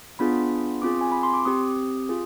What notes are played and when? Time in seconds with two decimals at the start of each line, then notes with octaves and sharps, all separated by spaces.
0.19 B3 D4 F4 G#4 B5
0.82 C4 F4 G#4 D6
1.01 G#5
1.12 B5
1.23 C6
1.34 D6
1.45 C4 G4 D#6
2.09 F4 G#4